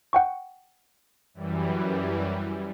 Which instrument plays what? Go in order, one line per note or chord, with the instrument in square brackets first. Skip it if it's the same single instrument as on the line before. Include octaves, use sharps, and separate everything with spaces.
[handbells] F#5 G5 C#6
[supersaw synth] F#2 E3 G3